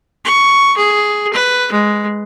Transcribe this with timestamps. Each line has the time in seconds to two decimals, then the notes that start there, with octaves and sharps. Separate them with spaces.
0.25 C#6
0.77 G#4
1.33 B4
1.72 G#3